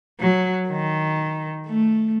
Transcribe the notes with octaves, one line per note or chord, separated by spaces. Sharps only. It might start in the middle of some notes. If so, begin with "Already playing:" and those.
F#3
D#3
A3